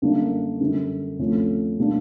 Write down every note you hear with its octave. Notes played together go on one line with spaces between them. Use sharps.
F#2 D3 G3 A#3 D4
F#2 D3 G3
D2 C3 F3 A3 C#4
B2 G3 A#3 D4